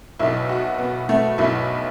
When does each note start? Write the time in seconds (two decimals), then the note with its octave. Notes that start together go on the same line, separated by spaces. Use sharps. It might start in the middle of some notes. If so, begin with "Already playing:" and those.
0.19 B1 B2 E4
0.49 F#4
0.78 B3
1.09 A3
1.38 B1 B2 E4